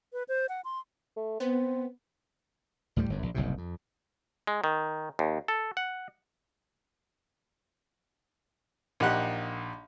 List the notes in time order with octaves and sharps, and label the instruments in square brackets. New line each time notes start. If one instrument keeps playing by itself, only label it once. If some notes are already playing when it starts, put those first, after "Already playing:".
[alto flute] B4
C5
F#5
C6
[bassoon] A3
[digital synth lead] B3 [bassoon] C4
[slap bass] D2 A2 D3 G3
G1 F#2
A#1
F#1 C2 A2 C3
F2
[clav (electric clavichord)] G#3
D#3
D#2
A4
F#5
[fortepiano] A#1 D#4 G4 F#5 F#6